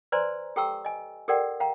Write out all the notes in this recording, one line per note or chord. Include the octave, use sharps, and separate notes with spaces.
B4 C5 D5 G#5 A#5 C6
G4 A4 G5 A#5 C#6 E6
D#5 G#5
G4 A4 A#4 D5 F#5 G5
F5 G5 A#5